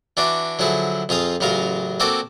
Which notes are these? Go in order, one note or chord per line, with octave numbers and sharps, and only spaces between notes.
E3 D4 F#4 D5
D3 F3 F#3 E4 G#4
F2 F4 G#4 F5 D#6
A1 C#3 F#3 F4 A#4 F5
A#3 C4 F#4 A4 D5